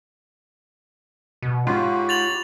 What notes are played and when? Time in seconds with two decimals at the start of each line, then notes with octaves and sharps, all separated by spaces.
1.42 B2
1.67 G#2 F4 G4 C#5 B5
2.09 A6 F7 F#7